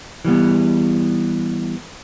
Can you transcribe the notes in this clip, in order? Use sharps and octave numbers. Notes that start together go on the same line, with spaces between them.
E3 G3 B3